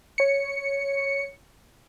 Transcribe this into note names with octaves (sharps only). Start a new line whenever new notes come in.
C#5 C#7